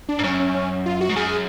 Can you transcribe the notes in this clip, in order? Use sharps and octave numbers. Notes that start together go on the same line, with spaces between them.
D4
G#2
F#2 C#4
C#4
C#4
F4
F#4
G#2
F#2 G#4